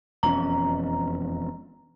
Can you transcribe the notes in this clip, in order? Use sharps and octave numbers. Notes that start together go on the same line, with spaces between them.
E1 F2 C#4 A#5